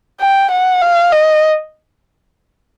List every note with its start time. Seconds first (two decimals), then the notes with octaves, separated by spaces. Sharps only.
0.21 G5
0.51 F#5
0.82 F5
1.12 D#5